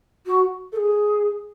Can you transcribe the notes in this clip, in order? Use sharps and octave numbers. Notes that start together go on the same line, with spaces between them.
F#4
A4
G#4